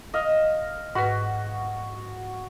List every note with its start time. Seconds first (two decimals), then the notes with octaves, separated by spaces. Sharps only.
0.14 D#5 F5
0.95 G#2 F#4 B4